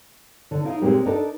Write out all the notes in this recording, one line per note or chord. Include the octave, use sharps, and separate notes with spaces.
D3
D#4 E4 F5
A#2 G#3 C4 G4 A#4
D4 D#4 A4 A#4